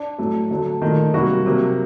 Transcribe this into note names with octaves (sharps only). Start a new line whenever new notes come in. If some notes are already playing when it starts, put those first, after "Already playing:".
Already playing: D4 D5
A2 F#3 A3
D3 F#3 A3
A#2 D#3 A3 D#4
C3 F#3 G3 A#3 F#4
C3 F#3 A#3